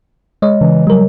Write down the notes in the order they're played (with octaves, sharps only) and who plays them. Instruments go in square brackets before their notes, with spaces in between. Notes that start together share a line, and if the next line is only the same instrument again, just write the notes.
[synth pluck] G#3 C#5 D#5
[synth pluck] C#3 [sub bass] E3
[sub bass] F#3 [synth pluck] G3 A#4